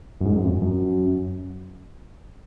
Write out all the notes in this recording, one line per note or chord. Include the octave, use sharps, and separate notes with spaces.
F#2
G#2
F#2
F2
F#2